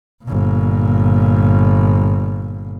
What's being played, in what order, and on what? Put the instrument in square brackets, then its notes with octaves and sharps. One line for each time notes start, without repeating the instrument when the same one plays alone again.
[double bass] G1 A#2